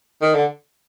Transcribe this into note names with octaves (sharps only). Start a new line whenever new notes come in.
D#3
D3